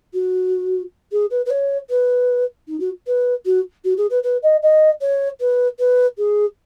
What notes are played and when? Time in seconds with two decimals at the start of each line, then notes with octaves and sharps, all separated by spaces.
0.13 F#4
1.11 G#4
1.30 B4
1.45 B4
1.50 C#5
1.89 B4
2.67 D#4
2.79 F#4
3.06 B4
3.45 F#4
3.84 F#4
3.97 G#4
4.10 B4
4.23 B4
4.42 D#5
4.62 D#5
5.01 C#5
5.40 B4
5.78 B4
6.17 G#4